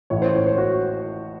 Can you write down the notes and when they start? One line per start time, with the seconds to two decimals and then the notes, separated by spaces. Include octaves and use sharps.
0.10 A1 A2 E3 C#5
0.22 C5
0.35 C#5
0.46 C5
0.58 F#4